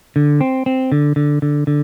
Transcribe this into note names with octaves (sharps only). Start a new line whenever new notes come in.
D3
C4
C4
D3
D3
D3
D3